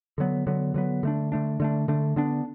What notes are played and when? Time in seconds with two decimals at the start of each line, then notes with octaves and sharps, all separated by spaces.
0.18 D3 F#3 B3
0.47 D3 F#3 B3
0.74 D3 F#3 B3
1.03 D3 A3 D4
1.32 D3 A3 D4
1.60 D3 A3 D4
1.88 D3 A3 D4
2.16 D3 B3 D4